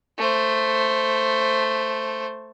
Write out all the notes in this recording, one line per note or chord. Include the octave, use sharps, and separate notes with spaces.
A3 C5